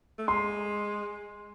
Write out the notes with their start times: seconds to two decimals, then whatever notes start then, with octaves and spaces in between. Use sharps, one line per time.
0.19 A3
0.27 G#3 C6